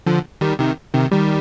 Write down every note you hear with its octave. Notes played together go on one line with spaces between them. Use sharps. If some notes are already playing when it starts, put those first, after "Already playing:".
D3 F3
D#3 G3
C3 D#3
C3 D#3
D#3 G3